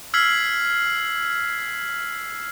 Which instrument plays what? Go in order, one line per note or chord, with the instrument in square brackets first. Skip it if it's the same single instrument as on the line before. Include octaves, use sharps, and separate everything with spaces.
[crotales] E6 F6 G#6 B6 C7 F#7